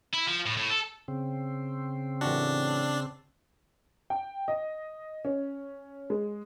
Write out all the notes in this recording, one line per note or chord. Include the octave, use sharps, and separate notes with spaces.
E4
F3
A2
A2
A4
C#3 C4
A1 D4 F#4
G5
D#5
C#4
G#3